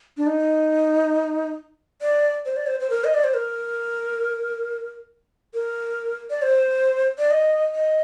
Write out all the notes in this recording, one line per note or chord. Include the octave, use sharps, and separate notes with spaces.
D4
D#4
D5
C5
D5
C5
C5
A#4
D#5
D5
C5
A#4
A#4
D5
C5
D5
D#5
D#5